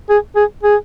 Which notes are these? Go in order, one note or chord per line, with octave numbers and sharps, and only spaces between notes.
G#4
G#4
G#4